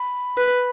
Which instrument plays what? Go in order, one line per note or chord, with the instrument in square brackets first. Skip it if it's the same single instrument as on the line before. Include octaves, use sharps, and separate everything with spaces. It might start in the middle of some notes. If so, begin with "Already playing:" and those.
Already playing: [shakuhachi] B5
[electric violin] B4